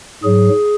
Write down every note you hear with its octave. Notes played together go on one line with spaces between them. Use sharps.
G#2 F#3 G#4